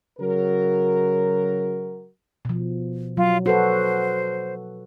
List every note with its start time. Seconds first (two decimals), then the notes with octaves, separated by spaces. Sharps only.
0.19 C#3 F#3 F#4 A#4
2.45 B2 F3
3.17 F#3 F4
3.46 F#4 A4 B4 C5